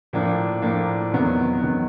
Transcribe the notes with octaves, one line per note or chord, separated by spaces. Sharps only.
A2 F3 A#3 D4
A2 F3 A#3 D4
E2 C3 D#3 F#3 B3
E2 C3 D#3 F#3 B3